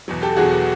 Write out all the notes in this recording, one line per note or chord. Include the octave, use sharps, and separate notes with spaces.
E2 B2 F#3
G4 A4
E2 B2 F#3 F#4 G#4